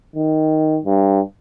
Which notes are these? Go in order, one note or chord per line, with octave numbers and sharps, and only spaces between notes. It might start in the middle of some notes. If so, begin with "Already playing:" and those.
D#3
G2